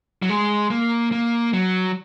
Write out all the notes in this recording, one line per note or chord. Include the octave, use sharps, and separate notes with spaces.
F#3
G#3
A#3
A#3
F#3